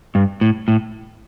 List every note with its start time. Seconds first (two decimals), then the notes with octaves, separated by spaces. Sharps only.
0.15 G2
0.41 A2
0.68 A2